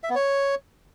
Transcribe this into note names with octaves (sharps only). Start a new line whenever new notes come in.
E5
B3
C#5